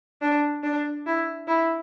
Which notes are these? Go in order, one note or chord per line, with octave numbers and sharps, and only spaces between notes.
D4
D4
E4
E4